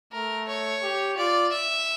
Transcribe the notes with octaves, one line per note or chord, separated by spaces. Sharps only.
A3 A#4
C#5
G4
F4 D5
E5